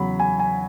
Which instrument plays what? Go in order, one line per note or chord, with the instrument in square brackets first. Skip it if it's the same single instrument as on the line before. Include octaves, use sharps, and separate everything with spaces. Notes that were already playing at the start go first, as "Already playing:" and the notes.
Already playing: [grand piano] E2 C#3 F#3 B5
G#5
G#5